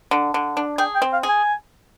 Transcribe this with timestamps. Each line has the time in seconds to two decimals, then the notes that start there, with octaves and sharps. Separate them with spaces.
0.11 D3
0.34 D3
0.57 D4
0.78 G#4 G5
0.95 G5
1.02 C4
1.13 F5
1.23 G#4
1.29 G#5